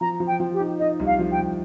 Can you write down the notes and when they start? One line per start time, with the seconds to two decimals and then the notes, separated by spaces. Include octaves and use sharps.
0.01 F3 A#5
0.20 F3
0.27 G5
0.40 F3
0.53 G4
0.60 D#4
0.79 D#4 D#5
1.00 C2
1.06 F5
1.19 F3
1.32 G5
1.39 C2